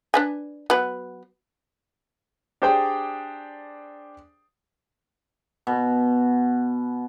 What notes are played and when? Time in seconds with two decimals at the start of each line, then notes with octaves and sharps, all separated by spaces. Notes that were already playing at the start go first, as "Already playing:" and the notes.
0.14 D4 B4 G#5
0.70 F#3 B3 B4
2.62 D4 G4 G#4 C5 D5 G5
5.67 B2